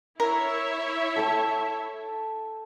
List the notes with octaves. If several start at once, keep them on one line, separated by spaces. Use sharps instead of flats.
E4 A#4 C#5 E5
A4 G5 A5